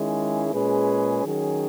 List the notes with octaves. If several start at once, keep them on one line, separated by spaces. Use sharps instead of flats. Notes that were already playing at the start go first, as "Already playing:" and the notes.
Already playing: D#3 G#3 C#4 E4 G#4
A#2 G#3 C#4 G#4 B4
D#3 F#3 C#4 G#4